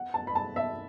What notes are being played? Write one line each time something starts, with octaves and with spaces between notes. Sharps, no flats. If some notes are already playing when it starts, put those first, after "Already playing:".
Already playing: F#5
A5
B5
A5
E5